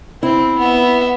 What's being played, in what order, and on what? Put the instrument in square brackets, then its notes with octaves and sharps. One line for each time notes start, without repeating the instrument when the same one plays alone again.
[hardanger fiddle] C4 [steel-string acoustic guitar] E4
[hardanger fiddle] B3 E5 [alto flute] F#5